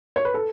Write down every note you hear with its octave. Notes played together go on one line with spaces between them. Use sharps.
C#5
B4
A4